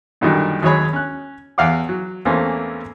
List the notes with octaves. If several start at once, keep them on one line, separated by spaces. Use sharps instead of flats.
F#2 A#2 D3 D#3 F#3 G3
D#2 F#3 G#3 G#4 C#5 B5
C#4 F#6
E2 F5 F#5 D6
F#3
E2 E3 A3 A#3 C4 C#4